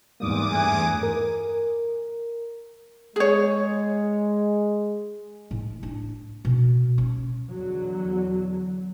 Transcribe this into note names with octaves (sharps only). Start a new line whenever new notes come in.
E2 G#2 G3 A#3 D6 D#6
G2 A3 G#5 F#6
A#4
G#3 G#4 C#5
A2
D4
B2
C#4
E2 D3 F#3